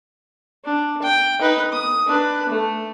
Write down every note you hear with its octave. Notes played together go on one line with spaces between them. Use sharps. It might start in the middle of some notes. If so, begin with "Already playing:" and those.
D4
G5
D#4 B4
D#6
D4 B4
A3